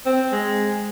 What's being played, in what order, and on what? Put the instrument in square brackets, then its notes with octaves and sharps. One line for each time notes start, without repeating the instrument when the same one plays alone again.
[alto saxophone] C4
G#3